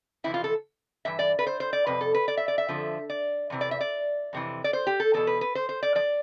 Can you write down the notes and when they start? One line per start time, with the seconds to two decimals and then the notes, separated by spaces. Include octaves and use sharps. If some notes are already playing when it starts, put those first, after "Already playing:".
0.24 F2 C3 E3 E4
0.34 F4
0.44 A4
1.05 G2 E3 E5
1.19 D5
1.39 B4
1.47 C5
1.60 C5
1.73 D5
1.87 F2 C3 B4
2.01 A4
2.15 B4
2.28 D5
2.37 E5
2.48 D5
2.58 E5
2.69 F2 D3 F3
3.10 D5
3.50 E2 C3 E3
3.61 D5
3.71 E5
3.81 D5
4.33 F2 C3 E3
4.64 D5
4.73 C5
4.87 G4
5.00 A4
5.14 E2 B2 A4
5.27 B4
5.41 B4
5.55 C5
5.69 C5
5.83 D5
5.95 F3 D5